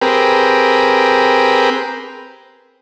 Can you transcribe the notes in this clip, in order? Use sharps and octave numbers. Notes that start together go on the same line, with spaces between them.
C4 G4 G#4 A#4 B4